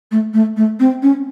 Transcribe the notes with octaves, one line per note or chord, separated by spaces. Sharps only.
A3
A3
A3
C4
C#4